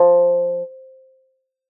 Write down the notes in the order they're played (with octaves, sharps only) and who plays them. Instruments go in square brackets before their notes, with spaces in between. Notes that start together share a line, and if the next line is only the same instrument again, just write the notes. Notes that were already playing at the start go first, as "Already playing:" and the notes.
Already playing: [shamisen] F3